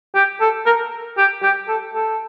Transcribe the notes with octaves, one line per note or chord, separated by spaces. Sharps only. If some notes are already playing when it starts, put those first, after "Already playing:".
G4
A4
A#4
G4
G4
A4
A4